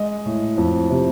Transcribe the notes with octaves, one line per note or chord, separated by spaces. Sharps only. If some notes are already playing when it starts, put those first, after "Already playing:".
Already playing: G#3 D#5
A2
F2
C3